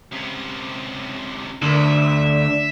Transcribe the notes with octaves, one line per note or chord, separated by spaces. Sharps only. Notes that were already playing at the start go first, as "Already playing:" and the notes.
C#2 C3
D2 D3 A3 D4 A#4 E5